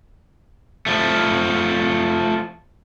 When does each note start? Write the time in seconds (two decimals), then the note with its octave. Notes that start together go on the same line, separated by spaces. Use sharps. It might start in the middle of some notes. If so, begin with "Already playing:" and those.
0.86 F3 A3